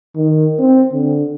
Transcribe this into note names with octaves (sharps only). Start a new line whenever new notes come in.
D#3
C4
D3